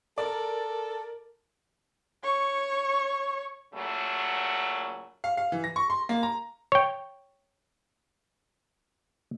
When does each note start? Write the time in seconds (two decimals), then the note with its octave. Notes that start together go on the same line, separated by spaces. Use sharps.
0.18 A4 A#4 D5
2.23 C#5 C#6
3.73 A#2 C#3 F#3 A3
5.24 F5
5.37 F5
5.52 E3
5.64 A#6
5.76 C#6
5.90 C6
6.09 A#3
6.23 A#5
6.72 C#5 G5